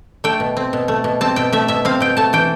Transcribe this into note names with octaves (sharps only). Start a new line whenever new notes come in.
A3 G5
B2
C4
B2
A3
B2
C4 A5
B2 G5
A3 E5
B2 E5
C4 F5
B2 G5
A3 A5
E3 G5